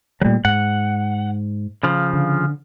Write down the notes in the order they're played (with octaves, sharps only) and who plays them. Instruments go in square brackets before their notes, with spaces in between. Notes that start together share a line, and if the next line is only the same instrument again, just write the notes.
[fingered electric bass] A#2 A3 [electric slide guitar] F#3 G3
[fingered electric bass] G#2 [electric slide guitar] F#5
[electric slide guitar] C#3 F3
[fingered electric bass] D3